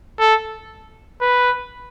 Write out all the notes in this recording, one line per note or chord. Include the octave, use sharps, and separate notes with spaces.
A4
B4